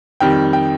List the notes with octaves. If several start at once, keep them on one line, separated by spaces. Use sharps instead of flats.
F2 D#3 G3 G5
G5